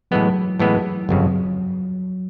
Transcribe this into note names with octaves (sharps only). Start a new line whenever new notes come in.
A2 E3 F#3 G#3 B3
A2 E3 G#3 B3
G1 F2 C#3 F3 F#3